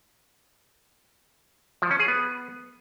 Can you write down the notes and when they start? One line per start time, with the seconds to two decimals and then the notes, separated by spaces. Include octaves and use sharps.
1.82 F3
1.91 C#4
1.99 G#4
2.08 B3